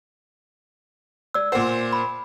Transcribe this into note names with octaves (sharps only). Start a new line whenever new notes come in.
D5 E6
A#2 C5 F#5
B5